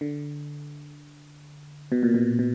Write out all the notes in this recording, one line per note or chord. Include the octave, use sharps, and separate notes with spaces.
D3
B2
A#2
B2
B2